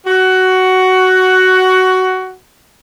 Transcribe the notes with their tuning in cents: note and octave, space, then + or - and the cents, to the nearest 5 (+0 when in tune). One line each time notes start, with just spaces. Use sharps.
F#4 +10